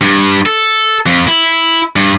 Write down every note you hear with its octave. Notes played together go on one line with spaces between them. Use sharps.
G2
A4
F2
E4
G2